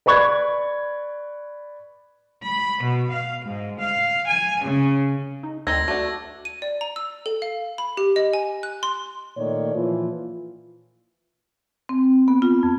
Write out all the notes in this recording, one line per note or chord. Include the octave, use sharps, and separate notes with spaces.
B4 D5 B5 C#6 F#6 G#6
B5
B2
F5
G#2
F5
G#5
C#3
D#4
D2 C4 D#4 G5 E6 G#6 A#6
A3 D4 F#4
D#7
D5
A#5
E6
A4
F5
B5
G4
D#5
G#5
F#6
C6
A#2 D#3 A3 C#5 D5
A#2 E3 F3 F4
C4
B3
F4
F2